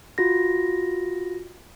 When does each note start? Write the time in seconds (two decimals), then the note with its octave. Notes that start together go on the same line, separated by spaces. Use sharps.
0.18 F4 F#4 A#6